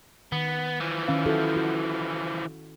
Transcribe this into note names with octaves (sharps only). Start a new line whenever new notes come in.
D#3 B3
E3 F3
D#3 C#4 F5
E4 F#4 A4
F#4